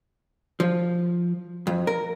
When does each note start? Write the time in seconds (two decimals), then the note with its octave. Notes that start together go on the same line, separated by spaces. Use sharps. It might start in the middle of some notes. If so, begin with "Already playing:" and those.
0.60 F3
1.67 F2
1.87 A#4